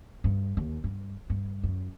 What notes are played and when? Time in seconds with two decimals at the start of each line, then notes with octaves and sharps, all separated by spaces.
0.24 G2
0.57 D#2
0.84 G2
1.30 G2
1.63 F#2